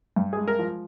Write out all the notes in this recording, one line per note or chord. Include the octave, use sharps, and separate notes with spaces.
G2
G#3 G#4
A#4
F3